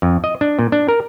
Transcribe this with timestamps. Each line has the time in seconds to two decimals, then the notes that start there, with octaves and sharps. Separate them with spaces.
0.02 F2
0.24 D#5
0.41 D4
0.59 A#2
0.72 D4
0.88 A#4